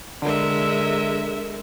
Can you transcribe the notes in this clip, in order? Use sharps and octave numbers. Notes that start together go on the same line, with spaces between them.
D3 G#3 A#4 E5